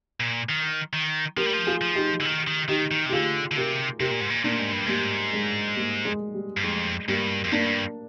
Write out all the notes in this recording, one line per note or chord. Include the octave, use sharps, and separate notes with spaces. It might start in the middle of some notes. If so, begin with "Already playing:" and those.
A#2
D#3
D#3
F3 G4 A#4
G3
F3
F4 G#4
F3
D#4 G4
D3
D#3
D#3
D#3 D#4 G4
D#3
C3
G4
D3 F4 G#4
D3
C3 G4 A#4
C3 G4 A#4
A#2
G#2
A#2
A#2 A#3 D4
G#2
G2
G#2 G3 A#3
G#3
G3 A#3
G#3
G3
G2
F2 G#3
G2 G3 A#3
F2
G2 A#3 D4